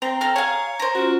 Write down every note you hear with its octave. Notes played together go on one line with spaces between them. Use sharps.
C4 G5 A#5
A4 A#4 F6
G#4 C#5 F5 A#5
A#4 C5
C#4 F4 F#4